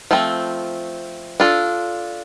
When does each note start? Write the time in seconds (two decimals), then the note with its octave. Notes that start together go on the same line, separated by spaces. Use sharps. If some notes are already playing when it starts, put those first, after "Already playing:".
0.11 F3 A3 C4
1.40 D4 F4 A4